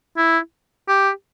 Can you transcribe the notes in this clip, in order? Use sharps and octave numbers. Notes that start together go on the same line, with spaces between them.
E4
G4